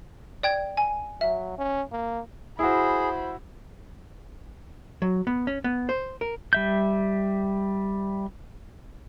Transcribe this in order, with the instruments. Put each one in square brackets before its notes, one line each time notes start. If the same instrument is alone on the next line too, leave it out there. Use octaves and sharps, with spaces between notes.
[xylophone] D5 G5 G#6
G#5
[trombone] F#3 [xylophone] E5
[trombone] C#4
A#3
[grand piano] E4 F#4 [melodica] G#4 [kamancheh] C5 B5
[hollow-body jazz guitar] F#3
B3
C#4
B3
C5
A#4
[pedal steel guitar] G3 E5 G6